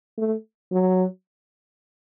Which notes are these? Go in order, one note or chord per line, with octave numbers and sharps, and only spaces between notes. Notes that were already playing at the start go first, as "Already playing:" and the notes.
A3
F#3